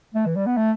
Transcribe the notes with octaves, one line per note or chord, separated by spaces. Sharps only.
A3
E3
G3
B3
A3